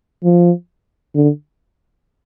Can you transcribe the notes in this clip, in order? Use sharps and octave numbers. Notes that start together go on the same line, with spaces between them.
F3
D3